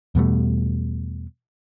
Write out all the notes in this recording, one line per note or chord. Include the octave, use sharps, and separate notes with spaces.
E2 B2 G3 A3